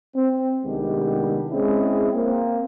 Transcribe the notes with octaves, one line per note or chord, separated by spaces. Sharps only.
C4
C2 D#3 G#3 B3 D4 G4
G#3 C4 C#4 E4 G#4
A#3 C4